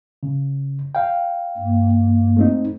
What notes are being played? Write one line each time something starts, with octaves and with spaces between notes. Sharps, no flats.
C#3
F5 G5
G2 A#3
A3 C4 D#4